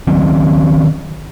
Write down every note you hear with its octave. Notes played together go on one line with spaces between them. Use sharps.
D#3 F#3 C4 C#4